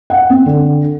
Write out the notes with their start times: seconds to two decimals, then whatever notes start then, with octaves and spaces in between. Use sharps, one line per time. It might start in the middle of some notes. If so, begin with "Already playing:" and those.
0.10 F#5
0.30 C4
0.46 D3